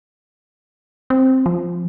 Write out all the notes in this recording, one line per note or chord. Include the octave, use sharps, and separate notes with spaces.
C4
F3